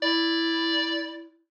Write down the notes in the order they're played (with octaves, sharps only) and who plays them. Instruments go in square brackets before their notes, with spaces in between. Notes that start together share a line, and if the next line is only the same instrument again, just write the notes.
[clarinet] E4 [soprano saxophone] D5